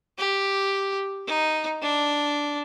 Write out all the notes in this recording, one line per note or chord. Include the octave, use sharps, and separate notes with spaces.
G4
D#4
D4